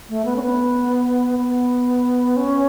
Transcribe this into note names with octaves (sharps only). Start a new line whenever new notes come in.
A3
B3
C#4
B3
B3
C#4